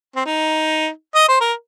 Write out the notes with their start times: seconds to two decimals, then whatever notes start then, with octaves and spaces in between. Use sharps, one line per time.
0.16 C4
0.26 D#4
1.15 D#5
1.28 C5
1.40 A#4